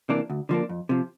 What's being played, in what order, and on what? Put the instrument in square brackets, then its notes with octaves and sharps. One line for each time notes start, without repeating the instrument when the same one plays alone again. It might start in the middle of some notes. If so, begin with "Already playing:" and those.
[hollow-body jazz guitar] C3 E3 A#3 D4
D2
D3 F3 A#3 D4
F2
C3 F3